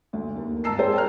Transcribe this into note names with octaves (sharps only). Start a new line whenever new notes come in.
D2
D#2
G#1 A5 A#5 E6 C7
G#4 A#4 C5 G5
A5 A#5 F6